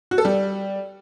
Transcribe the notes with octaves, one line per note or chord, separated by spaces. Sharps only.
F#4
A4
G3